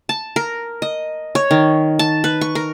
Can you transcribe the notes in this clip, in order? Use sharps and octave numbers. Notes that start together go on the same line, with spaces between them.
A5
A#4
D#5
C#5
D#3
A5
B4
C#6
A#4